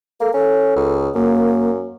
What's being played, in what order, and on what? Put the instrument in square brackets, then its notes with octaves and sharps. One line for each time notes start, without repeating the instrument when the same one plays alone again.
[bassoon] A#3 [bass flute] A4
[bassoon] C#4 [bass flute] A4
[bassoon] C#2
[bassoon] F#2 [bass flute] A#3